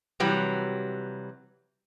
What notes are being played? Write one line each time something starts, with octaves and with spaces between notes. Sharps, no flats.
C3 E3 F#3 G3